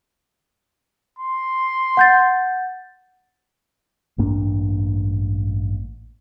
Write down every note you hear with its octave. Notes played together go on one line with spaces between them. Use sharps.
C6
F#5 G6 A6
A1 G2 A#3 D4